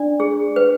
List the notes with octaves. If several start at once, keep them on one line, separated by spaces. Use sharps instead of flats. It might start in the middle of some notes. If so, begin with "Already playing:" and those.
Already playing: D4 D5
G#4
B4